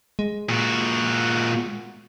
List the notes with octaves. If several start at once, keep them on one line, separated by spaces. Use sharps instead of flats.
G#3
A#2 F#4